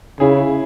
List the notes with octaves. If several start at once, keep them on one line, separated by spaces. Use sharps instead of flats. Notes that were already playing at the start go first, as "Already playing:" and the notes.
C#3 E4 G#4